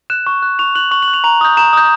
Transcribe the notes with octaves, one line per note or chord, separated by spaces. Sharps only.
F#6 E7
C#6
F#6
C#6 F7
F#6 F#7
C#6 F#7
F#7
F#6
F7
A#5 F7
D#6 G6
A#5 E7
D#6 G6